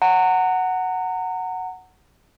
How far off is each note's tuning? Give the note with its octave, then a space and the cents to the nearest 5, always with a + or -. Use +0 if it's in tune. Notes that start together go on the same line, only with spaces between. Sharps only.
F#5 +0 A#5 -30